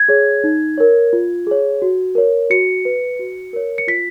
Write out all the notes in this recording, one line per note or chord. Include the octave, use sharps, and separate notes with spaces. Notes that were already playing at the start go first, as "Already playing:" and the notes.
Already playing: G#6
G#4 C#5
D#4
A#4 C#5
F4
G#4 C#5
F#4
A#4 C#5
F#4 C#7
B4
F#4
A#4 C#5
C#7
F4 B6